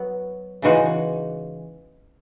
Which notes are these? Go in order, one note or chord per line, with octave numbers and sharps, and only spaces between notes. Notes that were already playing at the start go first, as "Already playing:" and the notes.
Already playing: F#3 B3 F#4
C#3 E3 G#3 D#4 F#4